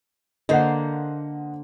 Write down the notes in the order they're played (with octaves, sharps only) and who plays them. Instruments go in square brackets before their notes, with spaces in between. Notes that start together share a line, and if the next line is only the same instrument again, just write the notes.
[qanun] D3 A#3 C5 [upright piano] D#5 F#5